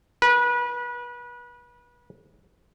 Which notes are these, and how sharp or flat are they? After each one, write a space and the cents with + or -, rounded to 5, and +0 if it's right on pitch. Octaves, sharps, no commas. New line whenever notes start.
B4 -30